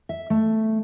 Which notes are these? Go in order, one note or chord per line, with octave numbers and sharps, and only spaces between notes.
E5
A3